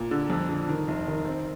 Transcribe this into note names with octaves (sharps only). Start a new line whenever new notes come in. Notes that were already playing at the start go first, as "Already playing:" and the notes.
Already playing: A#2
D3
F2
D3
D#3
F1
D#3
C4